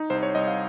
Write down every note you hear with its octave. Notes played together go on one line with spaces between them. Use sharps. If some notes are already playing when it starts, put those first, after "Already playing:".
Already playing: D#4
C2 C5
C#5
C2 D#5
F5